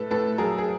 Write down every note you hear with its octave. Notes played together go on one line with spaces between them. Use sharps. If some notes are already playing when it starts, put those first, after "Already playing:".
Already playing: A2 A4 B4
A2 A4 B4
F#3 G#4 A#4
G#4